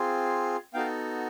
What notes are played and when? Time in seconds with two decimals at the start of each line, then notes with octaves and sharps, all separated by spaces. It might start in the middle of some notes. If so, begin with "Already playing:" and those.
Already playing: C4 F4 G#4
0.74 B3 D#4 F#4 A4 F5 G5